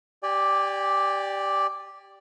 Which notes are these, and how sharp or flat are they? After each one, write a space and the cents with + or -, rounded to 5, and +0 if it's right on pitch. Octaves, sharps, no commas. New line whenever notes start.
G4 +0 D5 +0 G#5 -35